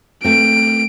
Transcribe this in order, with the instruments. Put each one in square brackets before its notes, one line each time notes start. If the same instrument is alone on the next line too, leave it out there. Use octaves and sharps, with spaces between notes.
[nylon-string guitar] A3 C4 [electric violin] D7